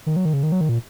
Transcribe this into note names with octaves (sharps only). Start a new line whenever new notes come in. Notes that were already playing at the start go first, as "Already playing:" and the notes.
D#3
F#3
D#3
C#3
D#3
F#3
D#3
A#2